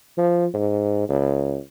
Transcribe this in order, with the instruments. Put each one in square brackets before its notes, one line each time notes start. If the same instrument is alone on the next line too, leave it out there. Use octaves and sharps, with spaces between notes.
[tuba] F3
G#2
C#2